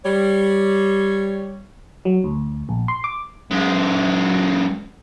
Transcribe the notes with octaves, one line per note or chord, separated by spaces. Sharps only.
G3 C#5
F#3
D2
A#1
C6
D6
F#2 G#3